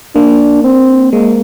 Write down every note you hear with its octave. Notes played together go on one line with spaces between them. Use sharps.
A#3 D4
C4
G#3 A#3